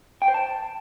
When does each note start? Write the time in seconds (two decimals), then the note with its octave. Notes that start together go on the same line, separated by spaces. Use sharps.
0.22 G5
0.28 C5
0.34 A5